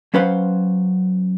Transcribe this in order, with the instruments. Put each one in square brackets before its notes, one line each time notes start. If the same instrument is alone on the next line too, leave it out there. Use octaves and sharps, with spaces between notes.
[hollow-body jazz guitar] F#3 C#4 B4 C5 F5 F#5